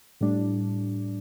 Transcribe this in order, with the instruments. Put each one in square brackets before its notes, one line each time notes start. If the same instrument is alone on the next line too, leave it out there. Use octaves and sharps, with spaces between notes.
[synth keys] A2 G3 D4